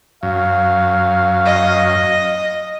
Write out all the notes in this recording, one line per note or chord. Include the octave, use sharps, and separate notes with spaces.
F#2 F5
D#5